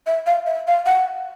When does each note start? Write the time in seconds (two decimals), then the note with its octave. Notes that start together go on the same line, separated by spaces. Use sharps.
0.06 E5
0.26 F5
0.46 E5
0.67 F5
0.86 F#5